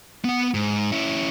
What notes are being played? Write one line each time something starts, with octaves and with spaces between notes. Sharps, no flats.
B3 F#5
G#2
C#4 E4